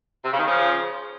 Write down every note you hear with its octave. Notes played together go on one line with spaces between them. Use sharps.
C3
C#3
D#3
C#3 F3